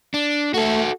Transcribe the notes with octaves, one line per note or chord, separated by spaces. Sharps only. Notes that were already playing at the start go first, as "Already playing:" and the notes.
D4
A3 F#4 A4